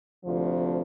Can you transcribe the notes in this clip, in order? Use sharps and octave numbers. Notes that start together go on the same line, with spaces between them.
D2 C3 F3